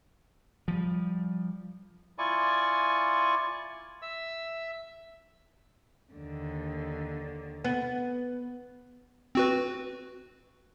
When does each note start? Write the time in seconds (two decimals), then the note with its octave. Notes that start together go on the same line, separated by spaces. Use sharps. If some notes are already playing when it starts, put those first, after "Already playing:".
0.68 F3 G3
2.18 E4 F4 D5 G#5 C#6
4.02 E5 E6
6.13 D#2 D3
7.64 B3
9.35 C4 F#4 B4